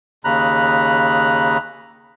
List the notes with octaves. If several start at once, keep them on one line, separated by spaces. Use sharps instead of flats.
D#2 C#3 A#5 B5 F#6